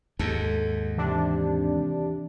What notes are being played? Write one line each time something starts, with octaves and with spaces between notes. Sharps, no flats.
D#2 G#2 A4
C3 E3 D4